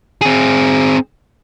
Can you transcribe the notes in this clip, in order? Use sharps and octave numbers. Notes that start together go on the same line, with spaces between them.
C4 G#4